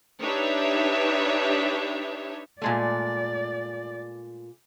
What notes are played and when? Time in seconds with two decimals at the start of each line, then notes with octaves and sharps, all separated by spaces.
0.21 D4 D#4 G4 B4 C#5 E5
2.62 A#2 G#3 A3 D5